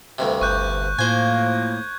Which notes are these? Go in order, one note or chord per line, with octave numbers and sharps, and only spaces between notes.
D2 G2 C3
G1 C#6 F#6 G6
A2 F3 A#3 C5 G#5 G#6